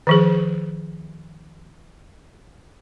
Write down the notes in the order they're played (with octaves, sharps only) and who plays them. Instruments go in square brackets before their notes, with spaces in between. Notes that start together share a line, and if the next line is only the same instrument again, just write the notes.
[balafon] D#3 F3 G#4